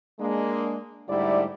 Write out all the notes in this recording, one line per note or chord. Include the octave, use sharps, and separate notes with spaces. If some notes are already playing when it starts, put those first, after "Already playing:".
G#3 A#3 D4
G#2 D3 G3 A3 E4 D5